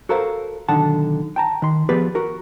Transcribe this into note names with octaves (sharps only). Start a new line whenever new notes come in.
F#4 A4 A#4 C5 F5
B1 D3 D#3 F#5 A5
G5 A5 A#5
D#3 C6
F3 B3 G4 G#4 B4 D5
F#4 A#4